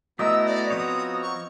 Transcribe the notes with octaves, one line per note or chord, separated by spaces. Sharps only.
A3 B3 E4 F#4 D#5 A#5 E6
D5
F3 C4 C#5 D#6
C#6